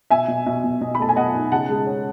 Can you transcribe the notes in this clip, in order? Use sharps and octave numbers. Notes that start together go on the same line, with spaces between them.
B2 E5 G#5
B2
B2 E5
B2
B2 D#5
B5
A3 A5
G#5
B2 D#5 F#5
D#4
C#3 F#5 A5
G#3
C#4